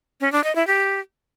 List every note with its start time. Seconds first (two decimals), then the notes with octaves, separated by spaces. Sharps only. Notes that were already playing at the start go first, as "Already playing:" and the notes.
0.21 C#4
0.32 D4
0.44 D#5
0.56 E4
0.67 G4